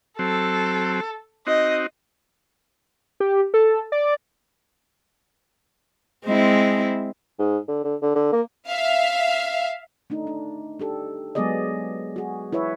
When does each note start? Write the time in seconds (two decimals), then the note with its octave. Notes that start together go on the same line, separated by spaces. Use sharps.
0.19 F#3 C4 A4
1.47 C4 D#4 F#4 D#5
3.20 G4
3.54 A4
3.92 D5
6.25 G#3 C4 E4
7.39 G#2
7.68 D3
7.84 D3
8.02 D3
8.15 D3
8.33 A#3
8.68 E5 F5
10.10 A3 D4 D#4
10.27 D4
10.80 D4 G4 A4
11.35 F#3 G#3 B3 G#4 D5 D#5
12.16 F#4 G#4
12.53 E4 B4 C#5 E5